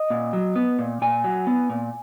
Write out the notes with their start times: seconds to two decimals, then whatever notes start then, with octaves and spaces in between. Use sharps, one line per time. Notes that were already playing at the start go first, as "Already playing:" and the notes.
Already playing: D#5
0.10 A#2
0.33 F#3
0.56 B3
0.79 A#2
1.02 A#2 G#5
1.24 F#3
1.47 B3
1.70 A#2